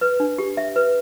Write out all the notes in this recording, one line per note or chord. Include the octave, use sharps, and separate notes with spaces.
B4
D4
G4
E5
B4